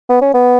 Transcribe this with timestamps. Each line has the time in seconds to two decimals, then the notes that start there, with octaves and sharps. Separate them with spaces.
0.09 B3
0.22 C#4
0.34 B3